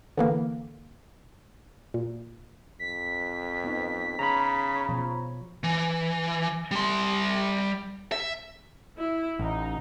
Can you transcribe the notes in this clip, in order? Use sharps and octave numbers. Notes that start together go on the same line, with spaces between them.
D3 E3 A#3
A#2
F2 B6
B3 D#4
C#3 A#5 B5
B2 F3 C#5
E3
G3 C6
E5
E4
A1 D#4